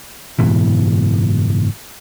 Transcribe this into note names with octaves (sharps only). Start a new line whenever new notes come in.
F#1 G#2 B2 E3